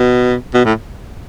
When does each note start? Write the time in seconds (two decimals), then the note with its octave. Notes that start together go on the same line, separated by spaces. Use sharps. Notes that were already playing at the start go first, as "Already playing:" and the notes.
Already playing: B2
0.54 B2
0.65 A2